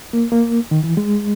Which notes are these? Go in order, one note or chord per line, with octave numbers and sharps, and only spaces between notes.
A#3
A#3
D#3
E3
G#3